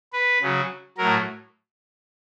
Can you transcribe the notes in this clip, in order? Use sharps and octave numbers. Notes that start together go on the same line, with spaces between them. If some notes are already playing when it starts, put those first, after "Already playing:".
B4
C#3 F#3
A2 F#3 A#4